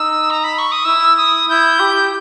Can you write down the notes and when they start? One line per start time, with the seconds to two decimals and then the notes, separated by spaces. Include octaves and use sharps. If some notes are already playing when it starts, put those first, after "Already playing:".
Already playing: D#4 E6
0.30 A#5
0.44 B5
0.58 C#6
0.72 D#6
0.85 E4 E6
1.17 D#6
1.48 E4 G6
1.80 G4